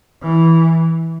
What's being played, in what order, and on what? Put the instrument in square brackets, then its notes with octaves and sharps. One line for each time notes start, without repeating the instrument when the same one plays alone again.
[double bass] E3